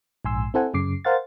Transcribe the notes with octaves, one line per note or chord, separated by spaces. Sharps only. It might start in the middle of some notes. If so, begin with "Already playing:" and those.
A#1 G#2 G#5 C6 E6
C4 E4 A4 C5 F#5 G#5
F#2 C#3 D6 C7
A#4 C5 F5 F#5 A6